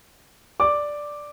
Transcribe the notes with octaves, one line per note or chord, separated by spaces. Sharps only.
D5 D6